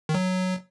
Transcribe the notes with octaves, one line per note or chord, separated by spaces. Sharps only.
D#3
F#3